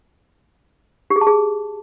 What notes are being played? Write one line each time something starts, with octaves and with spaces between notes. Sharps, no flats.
G4
G#4
A5
G#4